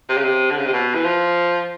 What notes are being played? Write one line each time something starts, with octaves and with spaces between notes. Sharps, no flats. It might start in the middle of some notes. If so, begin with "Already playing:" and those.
C3
C#3
C3
D3
C#3
C3
B2
E3
F3